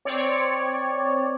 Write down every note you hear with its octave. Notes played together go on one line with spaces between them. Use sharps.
C4 C#5 D5